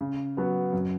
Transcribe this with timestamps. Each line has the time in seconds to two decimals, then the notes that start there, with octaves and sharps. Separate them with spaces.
0.01 C#3
0.37 F#3 B3
0.73 F#2